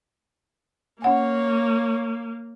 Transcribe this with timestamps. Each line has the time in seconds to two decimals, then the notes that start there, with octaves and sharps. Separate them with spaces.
1.02 A#3 C#4 C#5 F#5 G#5